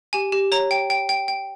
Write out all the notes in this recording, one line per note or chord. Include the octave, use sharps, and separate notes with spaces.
G4 G#5
G4
C#5 A#5
G5
G5
G5
G5